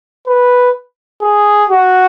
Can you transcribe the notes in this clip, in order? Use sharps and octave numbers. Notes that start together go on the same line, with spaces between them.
B4
G#4
F#4